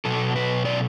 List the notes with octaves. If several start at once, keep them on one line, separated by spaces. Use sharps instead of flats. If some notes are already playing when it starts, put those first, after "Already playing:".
B2 F#3 A4
B4
D5